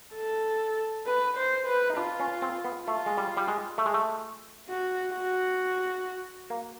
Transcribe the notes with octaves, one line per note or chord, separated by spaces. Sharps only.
A4
B4
C5
B4
D#4
D4 F4
C#4
C4
B3
A3 F4
G#3
G3
G3
G#3
A3
G#3
A3
F#4
F#4
A#3